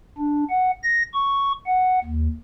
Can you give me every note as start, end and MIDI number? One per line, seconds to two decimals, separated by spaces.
0.18 0.44 62
0.49 0.71 78
0.83 1.03 94
1.13 1.52 85
1.66 1.99 78
2.04 2.27 39